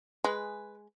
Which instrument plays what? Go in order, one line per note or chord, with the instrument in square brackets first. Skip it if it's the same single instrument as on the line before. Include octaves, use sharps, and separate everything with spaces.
[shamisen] G#3 [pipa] G#4 B4